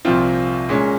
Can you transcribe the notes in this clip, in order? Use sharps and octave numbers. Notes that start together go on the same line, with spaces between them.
C2 A#2 F3 C4 F4
A#2 G#3 C#4